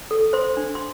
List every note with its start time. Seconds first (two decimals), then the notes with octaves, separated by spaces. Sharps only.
0.11 A4
0.33 C5 C6
0.57 D4
0.75 C6